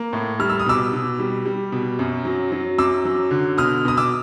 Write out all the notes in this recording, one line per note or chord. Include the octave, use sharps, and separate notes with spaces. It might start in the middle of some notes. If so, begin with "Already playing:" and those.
Already playing: A#3
A2
G3 F6
E6
D#6
B2 D6 E6
B2
G3
G3
B2
F#2
F#3
F#3
F#2 D6 E6
F#3
D3
B2 D#6 F6
B2 D#6
D6 E6